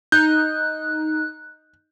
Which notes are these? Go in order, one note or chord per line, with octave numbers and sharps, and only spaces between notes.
D#4 F#6 G6